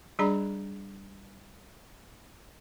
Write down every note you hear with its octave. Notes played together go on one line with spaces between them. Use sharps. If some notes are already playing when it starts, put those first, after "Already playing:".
G3 D4 G#4 D5 A#5 B5